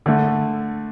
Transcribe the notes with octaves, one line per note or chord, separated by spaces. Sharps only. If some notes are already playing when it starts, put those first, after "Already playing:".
D3 A3